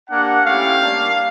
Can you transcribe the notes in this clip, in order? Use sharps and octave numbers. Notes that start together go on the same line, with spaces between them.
A#3 D4 G4 F#5
A3 C#4 E4 G4 F5
G3 A#3 D4